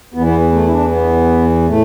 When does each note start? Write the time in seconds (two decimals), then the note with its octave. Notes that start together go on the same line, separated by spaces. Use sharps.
0.14 E2 B3
0.18 E3
0.27 B3
0.53 A3
0.67 E4
0.72 D4
0.91 B3
1.68 A2 A3